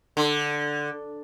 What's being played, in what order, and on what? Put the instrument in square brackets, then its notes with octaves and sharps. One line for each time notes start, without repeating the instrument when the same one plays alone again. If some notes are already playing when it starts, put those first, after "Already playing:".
[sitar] D3